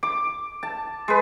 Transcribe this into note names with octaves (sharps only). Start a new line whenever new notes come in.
D6
A5
G#3 B4